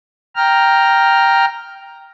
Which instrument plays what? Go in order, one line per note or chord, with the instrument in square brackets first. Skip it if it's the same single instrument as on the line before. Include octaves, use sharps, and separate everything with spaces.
[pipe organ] G5 A#5 F6